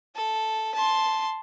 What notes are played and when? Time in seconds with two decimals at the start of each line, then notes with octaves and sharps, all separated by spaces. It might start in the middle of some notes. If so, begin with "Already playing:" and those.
0.16 A4
0.75 A5 C6